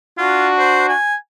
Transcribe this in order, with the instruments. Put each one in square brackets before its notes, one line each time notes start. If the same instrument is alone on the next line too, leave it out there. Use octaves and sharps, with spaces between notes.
[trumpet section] D4 F#4 [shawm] F4
[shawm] C5
G#5